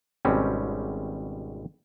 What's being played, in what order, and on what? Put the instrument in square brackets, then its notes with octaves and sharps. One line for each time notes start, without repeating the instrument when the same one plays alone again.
[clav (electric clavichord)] G#1 B2 G3 C4 C#4